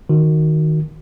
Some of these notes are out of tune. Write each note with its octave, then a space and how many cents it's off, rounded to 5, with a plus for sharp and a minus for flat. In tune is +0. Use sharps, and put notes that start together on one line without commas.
D#3 +0 F#4 +0